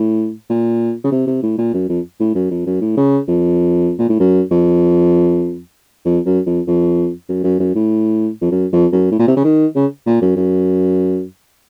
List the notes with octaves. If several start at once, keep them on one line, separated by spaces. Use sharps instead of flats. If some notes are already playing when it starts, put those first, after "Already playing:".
Already playing: A2
A#2
C#3
C3
C3
A2
A#2
F#2
F2
A2
F#2
F2
F#2
A2
C#3
F2
A#2
A2
F#2
F2
F2
F#2
F2
F2
F#2
F#2
F#2
A2
F2
F#2
F2
F#2
A2
A#2
C3
C#3
D#3
C#3
A#2
F#2
F#2